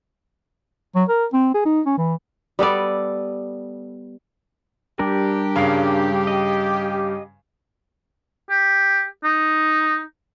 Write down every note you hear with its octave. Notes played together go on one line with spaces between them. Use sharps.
F#3
A#4
C4
G#4
D#4
C#4
E3
G3 B3 A4 D5
G3 D4 G4 A#4
G2 C#3 F5
D#5
G4
D#4